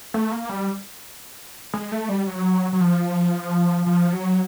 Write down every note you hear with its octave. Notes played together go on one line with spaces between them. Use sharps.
A3
A#3
G3
G#3
A3
G3
F#3
F#3
F3
F3
F#3